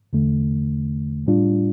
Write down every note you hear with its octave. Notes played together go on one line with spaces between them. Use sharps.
E2 D3 A3
A2 G3 D4 F4